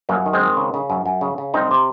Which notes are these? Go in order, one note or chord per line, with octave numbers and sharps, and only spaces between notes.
F#2 F#3 A#3
D#3
G#3 C4
D#3
C#3
C#3
F#2
F#2
C#3
C#3
C2 C4 D#4
C3